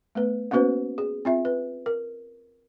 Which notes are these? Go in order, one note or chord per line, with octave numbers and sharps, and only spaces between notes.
A3 B3 B4
A#3 B3 C#4 F#4 B4 C5
G#4
C4 F4 E5
B4
A#4